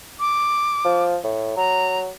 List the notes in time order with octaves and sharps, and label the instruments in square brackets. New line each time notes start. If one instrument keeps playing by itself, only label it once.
[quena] D6
[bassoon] F3
A2
[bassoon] F#3 [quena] A#5